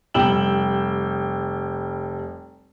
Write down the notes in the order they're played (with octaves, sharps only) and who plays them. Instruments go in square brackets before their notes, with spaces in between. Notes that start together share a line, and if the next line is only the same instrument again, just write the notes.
[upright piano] F1 G3 G5 E6 E7 F#7